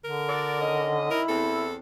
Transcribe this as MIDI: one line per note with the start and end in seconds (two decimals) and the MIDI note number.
0.04 1.06 50
0.04 0.90 70
0.28 0.56 66
0.28 0.56 69
0.28 0.56 74
0.60 1.22 51
0.60 1.22 61
0.60 1.22 75
1.11 1.70 64
1.11 1.22 70
1.28 1.79 40
1.28 1.79 60
1.28 1.75 69